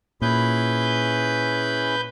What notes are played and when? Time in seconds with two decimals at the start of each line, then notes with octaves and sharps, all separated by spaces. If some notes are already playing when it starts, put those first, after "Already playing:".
0.22 A#2 C#4 E4 G#4 B4 G6